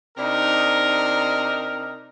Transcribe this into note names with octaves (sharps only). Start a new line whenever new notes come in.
C3 D4 D#4 A#4